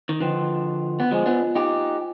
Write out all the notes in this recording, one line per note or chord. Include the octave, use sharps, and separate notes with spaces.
D#3
D3 F3 B4 D#5 G5
B3
F3 G#3 F4 C5 D#5 G#5
B3 D4
D#4 G4